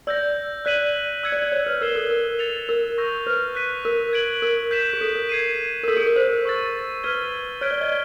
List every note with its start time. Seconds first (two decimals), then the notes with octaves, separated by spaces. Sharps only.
0.07 D5 E6 G6 A#6
0.65 D5 F#6 B6 D#7 F#7
1.23 E6 G#6 C#7
1.32 D5
1.42 D5
1.52 C#5
1.66 B4
1.81 A#4 E6 G#6 C7 E7 G7
1.95 A4
2.10 A#4
2.39 A6 C#7 F7
2.69 A#4
2.98 C#6 E6 G6 A#6
3.27 B4
3.55 F#6 B6 D#7
3.85 A#4
4.13 G#6 B6 D7 F#7
4.42 A#4
4.71 G6 B6 E7
4.93 G#4
5.01 A4
5.15 A#4
5.29 G#6 C7 D#7
5.84 A#4
5.88 A4 E6 G6 B6
5.97 G#4
6.06 A#4
6.16 C5
6.45 C#6 E6 A6
7.04 B4 G#6 B6 D#7 G7
7.61 C#5 F6 G#6 B6 D7 G7
7.71 D5
7.81 D#5